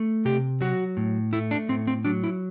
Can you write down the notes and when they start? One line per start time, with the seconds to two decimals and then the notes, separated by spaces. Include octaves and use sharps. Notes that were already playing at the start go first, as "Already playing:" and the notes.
Already playing: A3
0.25 C3 G4
0.61 F#3 F#4
0.97 A2
1.33 A3 E4
1.51 D4
1.69 A2 C4
1.87 C4
2.05 F#3 D4
2.24 E4